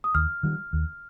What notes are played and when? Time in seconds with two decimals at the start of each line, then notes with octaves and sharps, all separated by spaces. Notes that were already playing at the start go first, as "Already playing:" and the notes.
0.04 D#6
0.15 D#2 F6
0.43 D#3 G3
0.73 D#2